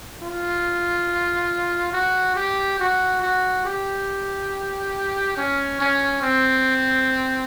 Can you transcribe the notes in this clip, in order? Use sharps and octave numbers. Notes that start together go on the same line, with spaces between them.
F4
F#4
G4
F#4
F#4
G4
C#4
C#4
C4